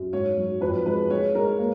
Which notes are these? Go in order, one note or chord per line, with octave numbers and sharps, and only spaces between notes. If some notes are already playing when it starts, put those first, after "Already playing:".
Already playing: F#2
G#2 C#5
F#3
F2 B4
G#3 B4
G#3 C#5
G#3 A#4
A#3